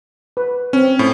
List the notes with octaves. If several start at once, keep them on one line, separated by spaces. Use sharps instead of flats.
B4
C4 C#4
A2